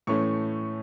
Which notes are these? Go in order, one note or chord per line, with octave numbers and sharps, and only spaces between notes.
A2 E3 A3 C#4 C#6